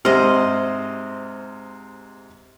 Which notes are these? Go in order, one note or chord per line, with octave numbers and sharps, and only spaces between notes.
G#2 C3 C5 D#5 F6